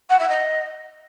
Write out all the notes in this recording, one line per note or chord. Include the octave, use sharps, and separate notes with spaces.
F#5
E5
D#5